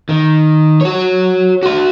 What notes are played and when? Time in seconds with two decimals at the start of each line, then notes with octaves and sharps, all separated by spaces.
0.09 D#3
0.81 F#4 C#5
1.63 F#4 C6